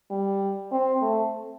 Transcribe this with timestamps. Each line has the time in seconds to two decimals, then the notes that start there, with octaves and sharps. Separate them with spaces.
0.11 G3
0.72 C4
1.01 A3